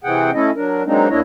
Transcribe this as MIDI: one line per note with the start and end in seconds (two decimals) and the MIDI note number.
0.04 0.31 48
0.04 0.31 52
0.04 0.31 60
0.04 0.31 68
0.04 0.31 78
0.04 0.31 79
0.34 0.51 57
0.34 0.51 61
0.34 0.51 64
0.34 0.51 69
0.34 0.51 75
0.56 0.83 54
0.56 0.83 62
0.56 0.83 70
0.86 1.08 54
0.86 1.08 56
0.86 1.08 58
0.86 1.08 60
0.86 1.08 62
0.86 1.08 63
1.10 1.20 38
1.10 1.20 58
1.10 1.20 62
1.10 1.20 64
1.10 1.20 73
1.10 1.20 75